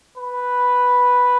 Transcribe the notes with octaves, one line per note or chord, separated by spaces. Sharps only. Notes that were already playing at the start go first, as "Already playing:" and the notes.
B4